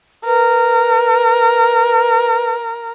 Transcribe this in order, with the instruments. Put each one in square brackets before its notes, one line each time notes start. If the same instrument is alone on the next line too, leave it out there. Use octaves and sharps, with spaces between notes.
[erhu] A#4 [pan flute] B4